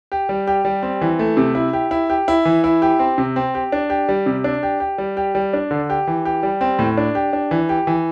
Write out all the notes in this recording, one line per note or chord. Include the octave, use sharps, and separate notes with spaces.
G4
G3
G4
G3
C4
E3
A3
C3
E4
G4
E4
G4
E4
E3
E4
G4
C4
C3
C4
G4
D4
G4
G3
C3
D4
G4
G4
G3
G4
G3
D4
D3
G4
E3
G4
G3
C4
A2
D4
G4
D4
E3
G4
E3